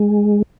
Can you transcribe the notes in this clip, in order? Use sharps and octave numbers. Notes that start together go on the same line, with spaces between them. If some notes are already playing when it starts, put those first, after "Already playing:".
Already playing: G#3